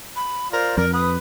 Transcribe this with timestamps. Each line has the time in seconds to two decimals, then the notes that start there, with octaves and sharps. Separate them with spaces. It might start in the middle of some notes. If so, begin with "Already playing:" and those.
0.16 B5
0.52 F4 A#4 C5 D5
0.78 F2 A#4
0.93 B4 D#6